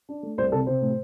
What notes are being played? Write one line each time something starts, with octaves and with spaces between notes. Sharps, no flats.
D4
A3
C2 C5
C3 A4
C3 C5
A2